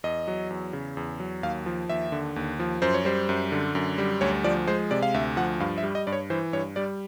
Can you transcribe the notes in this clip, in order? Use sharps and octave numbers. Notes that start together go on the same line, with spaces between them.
E2 D#5
F#3
E2
C#3
E2
F#3
D#2 F5
F3
D#2 E5
D3
D#2
F3
F#2 C5
C#5
G3 C5
F#2
D3
F#2
G3
D2 C#5
F3 D5
G#3 C5
C3 D5
F5
D2 E5
F3 F#5
G2 F5
E5
G3
D#5
G2 D5
C#5
E3 C5
G2 C#5
G3 D5